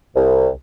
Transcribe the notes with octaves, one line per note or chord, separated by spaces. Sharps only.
C2